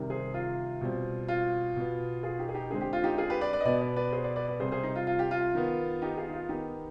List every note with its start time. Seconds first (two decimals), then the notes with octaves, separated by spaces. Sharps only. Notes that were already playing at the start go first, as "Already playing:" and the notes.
Already playing: C3 D#3 G3
0.10 G#4 C5
0.34 F4
0.81 B2 G3 C4
1.28 F4
1.76 B2 B3
2.23 F4 G#4
2.39 D#4 G4
2.49 G#4
2.55 D#4 G4
2.70 D3 G#3 C4 G#4
2.81 G4
2.93 F4
3.04 D#4 G4
3.18 F4 G#4
3.30 G4 B4
3.41 B4 D5
3.53 B4 D5
3.61 D#5
3.65 B2 B3 B4 D5
3.81 B4 D5
3.96 B4 D5
4.13 G#4 C5
4.24 B4 D5
4.36 B4 D5
4.48 B4 D5
4.60 C3 G3 C4 G#4 C5
4.72 G#4 C5
4.83 D#4
4.96 F4
5.07 F4
5.19 G4
5.31 F4
5.55 D#3 B3
6.02 D#4 G4
6.17 F4 G#4
6.29 D#4
6.33 F4
6.49 D#3 B3 D#4 G4